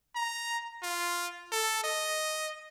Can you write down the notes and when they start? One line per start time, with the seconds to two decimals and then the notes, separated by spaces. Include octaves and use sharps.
0.15 A#5
0.83 F4
1.52 A4
1.84 D#5